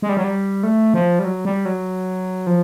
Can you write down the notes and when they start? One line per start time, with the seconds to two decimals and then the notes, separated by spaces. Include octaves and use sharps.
0.02 G#3
0.09 G3
0.17 F#3
0.24 G3
0.63 A3
0.94 F3
1.19 G3
1.24 F#3
1.45 G3
1.65 F#3
2.47 F3